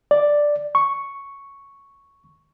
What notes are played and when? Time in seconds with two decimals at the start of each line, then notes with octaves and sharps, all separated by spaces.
0.11 D5
0.75 C#6